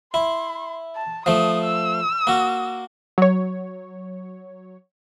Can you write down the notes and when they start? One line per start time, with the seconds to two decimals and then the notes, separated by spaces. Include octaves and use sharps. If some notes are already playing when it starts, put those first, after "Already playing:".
0.14 E4 C6
0.95 A5
1.26 F3 A3 D#6
1.64 E6
2.27 A#3 F#4
3.18 F#3 C#5